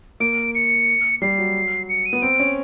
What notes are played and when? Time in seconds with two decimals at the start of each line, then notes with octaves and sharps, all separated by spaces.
0.20 A#3 D7
0.55 C#7
1.22 G3 C7
1.38 F#3
1.89 C#7
2.06 D#7
2.13 B3
2.22 C4 D7
2.40 C#4